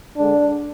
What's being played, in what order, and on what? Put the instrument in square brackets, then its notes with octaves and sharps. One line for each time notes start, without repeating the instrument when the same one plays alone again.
[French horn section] D3 G#3 D4